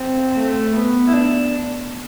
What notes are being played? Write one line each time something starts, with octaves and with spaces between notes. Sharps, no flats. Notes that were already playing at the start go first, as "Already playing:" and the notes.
Already playing: C4
A3
B3
E4
D4